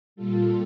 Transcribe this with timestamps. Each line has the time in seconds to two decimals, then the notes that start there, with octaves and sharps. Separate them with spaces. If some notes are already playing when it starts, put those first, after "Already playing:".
0.16 A#2 G3 F4 A4